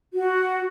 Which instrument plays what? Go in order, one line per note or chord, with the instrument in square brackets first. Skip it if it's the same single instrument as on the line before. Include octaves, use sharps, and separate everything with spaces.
[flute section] F#4